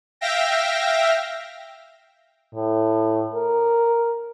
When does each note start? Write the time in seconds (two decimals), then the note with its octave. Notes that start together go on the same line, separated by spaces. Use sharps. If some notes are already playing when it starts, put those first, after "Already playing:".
0.21 E5 F5 G5 A#6
2.55 A2
3.34 A#4